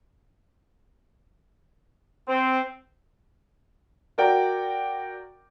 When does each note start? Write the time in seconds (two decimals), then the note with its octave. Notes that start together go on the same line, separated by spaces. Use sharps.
2.29 C4
4.18 F#4 A#4 D5 G5